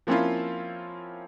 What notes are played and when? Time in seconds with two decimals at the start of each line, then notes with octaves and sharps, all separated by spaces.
0.07 F3 A#3 C4 C#4 E4 F4